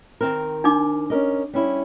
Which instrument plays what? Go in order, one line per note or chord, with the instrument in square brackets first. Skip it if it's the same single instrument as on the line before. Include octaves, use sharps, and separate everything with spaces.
[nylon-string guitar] D#3 C4 A#4
[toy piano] D4 D#4 D6
[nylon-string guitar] C#4 A#4 D#5
G3 C#4 E4